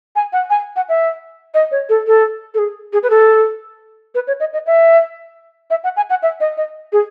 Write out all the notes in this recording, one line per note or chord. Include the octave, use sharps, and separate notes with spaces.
G#5
F#5
G#5
F#5
E5
D#5
C#5
A4
A4
A4
G#4
G#4
B4
A4
B4
C#5
D#5
D#5
E5
E5
F#5
G#5
F#5
E5
D#5
D#5
G#4